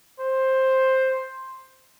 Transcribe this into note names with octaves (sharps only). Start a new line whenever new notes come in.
C5